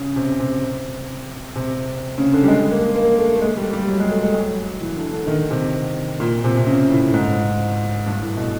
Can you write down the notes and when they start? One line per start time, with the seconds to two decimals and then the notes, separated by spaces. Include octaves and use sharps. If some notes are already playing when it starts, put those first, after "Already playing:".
Already playing: C#3
0.16 C3
0.39 C3
1.56 C3
2.18 C#3
2.33 D3
2.43 G3
2.48 G#3
2.72 A#3
2.95 A#3
3.19 A3
3.36 A3
3.41 G#3
3.57 G3
3.73 G3
3.88 F#3
4.00 G#3
4.11 A3
4.23 G#3
4.35 F#3
4.81 E3
4.96 D3
5.12 D3
5.27 D#3
5.50 C3
6.20 A#2
6.44 C3
6.57 C3
6.67 C#3
6.90 A2
7.14 G#2
8.06 G2
8.22 A2
8.37 B2